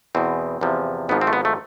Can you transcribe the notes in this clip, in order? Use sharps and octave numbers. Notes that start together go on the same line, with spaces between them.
E2 B2 C4
E2 C3 F3
G#1 G#2 F3 B3
C4
A3
B3
A3